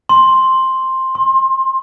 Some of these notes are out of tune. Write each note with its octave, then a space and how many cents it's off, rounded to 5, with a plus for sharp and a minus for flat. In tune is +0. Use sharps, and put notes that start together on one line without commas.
C6 +5
C6 +25